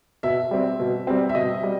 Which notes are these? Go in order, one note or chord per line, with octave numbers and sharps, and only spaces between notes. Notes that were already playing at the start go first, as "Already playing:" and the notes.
B2 E5
G3 C4
B2
G3 C4
E5
B2 D#5
G3